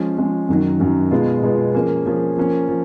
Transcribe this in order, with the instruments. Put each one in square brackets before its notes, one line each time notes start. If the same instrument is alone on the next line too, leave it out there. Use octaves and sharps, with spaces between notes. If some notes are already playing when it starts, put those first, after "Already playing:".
Already playing: [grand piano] F3 G#3 C#4 G#4
F3 G#3 C#4 G#4
F#2 D#3 F#3
F#2 D#3 F#3
B2 G#3 B3 F4 G#4
B2 G#3 B3 F4 G#4
F3 A#3 C#4 G#4
F3 A#3 C#4 G#4
F3 A#3 C#4
F3